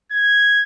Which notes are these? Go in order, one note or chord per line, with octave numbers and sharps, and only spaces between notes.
G#6